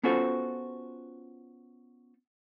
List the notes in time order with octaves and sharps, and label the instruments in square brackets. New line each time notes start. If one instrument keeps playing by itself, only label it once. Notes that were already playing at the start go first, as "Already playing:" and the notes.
[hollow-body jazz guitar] B3 C#4 F4 F#4 A4 C5